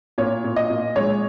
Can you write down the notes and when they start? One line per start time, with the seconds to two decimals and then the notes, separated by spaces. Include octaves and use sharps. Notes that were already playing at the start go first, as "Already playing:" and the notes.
0.18 A#2 C#5
0.44 A#2
0.56 D#5
0.70 A#2
0.96 G#3 C#5